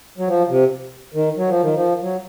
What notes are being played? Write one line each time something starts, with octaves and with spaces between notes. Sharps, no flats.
F#3
F3
C3
D#3
F#3
F3
D#3
F3
F#3